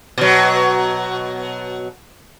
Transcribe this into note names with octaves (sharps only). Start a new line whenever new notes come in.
B2 F#3